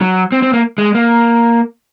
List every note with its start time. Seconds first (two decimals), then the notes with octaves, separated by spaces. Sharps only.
0.01 F#3
0.32 C4
0.42 C4
0.53 A#3
0.78 G#3
0.95 A#3